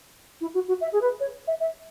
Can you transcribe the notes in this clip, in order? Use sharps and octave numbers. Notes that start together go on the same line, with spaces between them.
E4
F#4
F#4
E5
G#4
B4
C#5
E5
E5